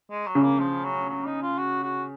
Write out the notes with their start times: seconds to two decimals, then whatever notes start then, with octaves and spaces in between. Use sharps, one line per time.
0.11 G#3
0.27 F#3
0.35 C#3
0.43 A#3
0.60 F3
0.84 F#3
1.09 F#3
1.26 D#4
1.42 F4
1.58 F#4
1.83 F#4